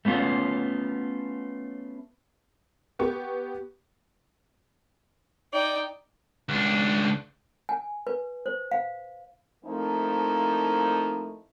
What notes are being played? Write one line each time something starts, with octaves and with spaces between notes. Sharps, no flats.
A3 B3 C#4 F4
B3 G4 C#6
D#4 D5 G5
C#2 D4
G#5
B4
C5
F5
F3 A3 A#3 C4 D#4 E4